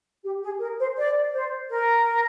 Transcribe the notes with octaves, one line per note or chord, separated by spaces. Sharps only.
G4
G#4
A#4
C5
D5
C5
A#4